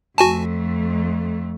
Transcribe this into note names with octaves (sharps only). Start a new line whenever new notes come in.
F2 A3 F#4 G#5 A5